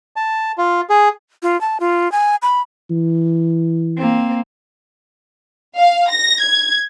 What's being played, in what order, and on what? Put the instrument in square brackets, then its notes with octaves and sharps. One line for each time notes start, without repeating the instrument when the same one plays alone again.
[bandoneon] A5
F4
G#4
[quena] F4
A5
F4
G#5
B5
[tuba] E3
[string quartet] A#3 C4
[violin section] F5
A#6
G#6